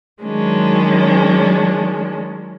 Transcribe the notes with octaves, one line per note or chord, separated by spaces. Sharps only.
D#3 F#3 G#3 C#4 D4